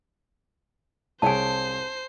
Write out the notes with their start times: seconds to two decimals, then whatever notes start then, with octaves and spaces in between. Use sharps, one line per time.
1.22 C2 G#4 C5 C#5 G#5 A5 C7